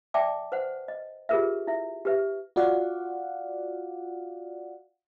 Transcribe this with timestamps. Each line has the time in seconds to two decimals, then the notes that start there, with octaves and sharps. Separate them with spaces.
0.14 D5 E5 G5 A5 D6
0.52 B4 C5 F#5
0.88 D#5
1.29 F4 G4 G#4 A#4 B4 E5
1.67 E4 E5
2.05 G4 B4 E5
2.56 F4 F#4 D5 F5 F#5